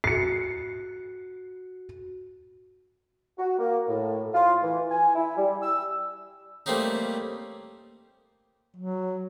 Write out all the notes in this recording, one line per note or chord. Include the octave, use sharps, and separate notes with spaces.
F#4 C7 C#7
F#4
A#3
A2
F4
E3
G#5
E4
G3
E6
G3 A3 A#3 C4 C#4 D#4
F#3